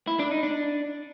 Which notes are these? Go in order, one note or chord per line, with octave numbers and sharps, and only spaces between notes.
E4
D4
D#4
D4